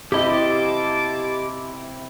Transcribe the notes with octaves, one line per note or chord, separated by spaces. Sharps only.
C3 A#3 E4 G4 D#5 A5 D6